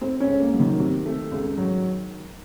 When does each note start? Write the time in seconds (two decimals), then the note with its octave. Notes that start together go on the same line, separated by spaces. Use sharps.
0.01 A3 C4
0.20 C#4
0.27 C#2
0.40 A#3
0.54 F#3
0.60 D#3
0.79 C3
1.05 A3
1.32 C#2
1.58 F#3